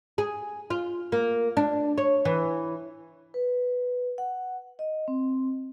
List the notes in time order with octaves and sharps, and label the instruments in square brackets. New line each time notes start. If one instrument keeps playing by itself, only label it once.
[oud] G#4
F4
A#3
D4
C#5
E3
[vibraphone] B4
F#5
D#5
C4